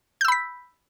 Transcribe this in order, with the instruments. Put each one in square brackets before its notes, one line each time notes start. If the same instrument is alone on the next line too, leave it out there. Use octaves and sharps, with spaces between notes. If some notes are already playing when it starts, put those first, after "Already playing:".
[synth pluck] G6
E6
B5
B6